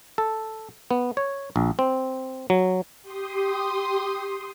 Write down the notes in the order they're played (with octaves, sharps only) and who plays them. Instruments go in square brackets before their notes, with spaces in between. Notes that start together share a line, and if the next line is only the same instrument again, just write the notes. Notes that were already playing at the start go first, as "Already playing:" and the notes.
[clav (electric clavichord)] A4
B3
C#5
A#1
C4
F#3
[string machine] G4 C6 D#6